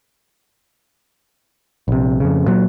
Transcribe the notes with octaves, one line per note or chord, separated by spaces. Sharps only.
A#1 C3
F2 C#3
A#2 F#3